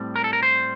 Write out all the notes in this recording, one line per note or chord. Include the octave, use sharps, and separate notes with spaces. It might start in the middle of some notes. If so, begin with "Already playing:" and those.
Already playing: A2 G3 C4
A#4
A4
A#4
C5